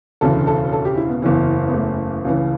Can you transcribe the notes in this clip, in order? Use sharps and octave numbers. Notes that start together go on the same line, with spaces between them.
E1 D2 C#3 E3 A4
A4
A4
G4
E4
B3
F#1 E2 C#3 E3
B3
A3
C#2 C#3 E3